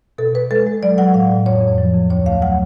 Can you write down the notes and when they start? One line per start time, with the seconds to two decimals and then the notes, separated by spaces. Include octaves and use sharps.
0.18 B2 A4
0.34 B2 B4
0.51 G#3 A4
0.66 G#3
0.83 F#3 D5
0.98 F#3 F#5
1.14 A2 F5
1.30 A2
1.46 F2 C#5
1.62 F2
1.78 F3
1.94 F2
2.10 D2 C#5
2.26 A3 F5
2.42 F#3 F#5